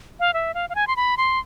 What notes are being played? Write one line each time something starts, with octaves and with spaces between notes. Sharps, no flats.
F5
E5
F5
F5
G#5
C6
B5
C6